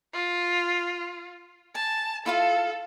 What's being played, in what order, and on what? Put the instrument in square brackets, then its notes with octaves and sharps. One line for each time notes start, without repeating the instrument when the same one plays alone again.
[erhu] F4
[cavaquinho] G#5 [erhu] A5
[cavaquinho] E4 F4 F5 [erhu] A4